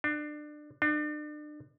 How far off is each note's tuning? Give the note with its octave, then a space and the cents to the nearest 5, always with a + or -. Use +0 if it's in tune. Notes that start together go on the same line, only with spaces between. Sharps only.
D4 +25
D4 +35